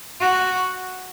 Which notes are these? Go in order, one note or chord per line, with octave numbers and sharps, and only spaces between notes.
F#4